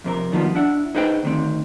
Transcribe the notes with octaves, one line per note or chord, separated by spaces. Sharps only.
F2 C3 A#4
D#2 D#3 F3 G3 B3
D4 E4 F#5
D#4 G#4 B4 C5 F5 G5
D2 D#3 C4